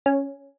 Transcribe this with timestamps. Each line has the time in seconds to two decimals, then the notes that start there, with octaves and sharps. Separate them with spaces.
0.06 C#4